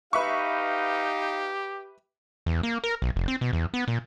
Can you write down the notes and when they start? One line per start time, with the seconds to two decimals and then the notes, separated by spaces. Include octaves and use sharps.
0.13 D#4 G4 B4 E5 F5 C#6
2.46 E2
2.63 A#3
2.84 A#4
3.02 B1
3.16 F1
3.28 C4
3.41 B2
3.53 E2
3.74 B3
3.88 A#2